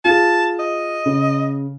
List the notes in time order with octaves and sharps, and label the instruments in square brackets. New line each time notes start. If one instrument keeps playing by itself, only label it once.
[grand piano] F4 G#4 [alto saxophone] A5
[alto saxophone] D#5
[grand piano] C#3